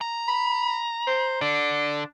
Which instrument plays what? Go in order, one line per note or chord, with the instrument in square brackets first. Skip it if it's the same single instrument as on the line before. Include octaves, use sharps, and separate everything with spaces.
[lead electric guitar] A#5
[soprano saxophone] B5
C5
[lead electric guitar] D3 [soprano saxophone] D4